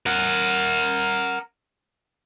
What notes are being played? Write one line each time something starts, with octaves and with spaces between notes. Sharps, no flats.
A#4 F#5